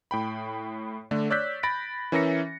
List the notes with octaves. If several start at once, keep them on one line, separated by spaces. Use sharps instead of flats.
A2 G5 B5
D3 A3 D4
C#5 D5 E6 F#6 G6 B6
B5 A6 A#6 D7
E3 C#4 A#4 E5 A#6 C#7